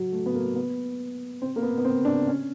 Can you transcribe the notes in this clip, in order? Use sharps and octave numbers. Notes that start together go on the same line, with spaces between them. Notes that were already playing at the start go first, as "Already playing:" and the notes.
Already playing: F#3
A3
B3
A#3
B3
C4
A#3
B3
B3
C4
D4
C#4